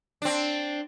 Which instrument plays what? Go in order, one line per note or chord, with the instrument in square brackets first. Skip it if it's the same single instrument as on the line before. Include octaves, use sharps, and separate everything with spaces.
[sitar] C4 D4